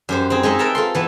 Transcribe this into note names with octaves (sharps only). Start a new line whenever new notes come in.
F#2 G4 C5
C4 D#4 G#4
G#3 D#4 D#5 E5
A#4 B4 E5 G5 A5 A#5
F4 A4 C6
E3 B3 E4